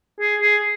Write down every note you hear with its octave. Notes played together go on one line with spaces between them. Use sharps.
G#4
G#4